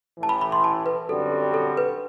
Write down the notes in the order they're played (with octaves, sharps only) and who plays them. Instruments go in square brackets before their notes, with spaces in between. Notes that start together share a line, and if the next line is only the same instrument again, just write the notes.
[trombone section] A1 A2 E3 [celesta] A5
[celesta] B5
B5
C6
A5
B4
[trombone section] F#2 D3 G3 C4 F#4 [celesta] A4
[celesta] A4
B4